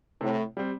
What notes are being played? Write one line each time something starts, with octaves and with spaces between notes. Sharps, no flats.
A2 C3
G3 C4